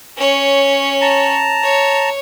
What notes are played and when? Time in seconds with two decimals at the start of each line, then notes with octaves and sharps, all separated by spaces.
0.17 C#4 C#5
1.01 A5 A#5
1.63 C#5